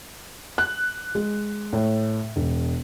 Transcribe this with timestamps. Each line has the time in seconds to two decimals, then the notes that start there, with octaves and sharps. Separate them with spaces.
0.58 F#6
1.15 G#3
1.73 A2
2.36 E1